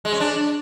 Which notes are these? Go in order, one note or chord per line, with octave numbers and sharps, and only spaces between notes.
G#3
C#4
D4